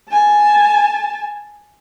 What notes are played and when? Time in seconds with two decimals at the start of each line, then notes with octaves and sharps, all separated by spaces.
0.11 G#5 A5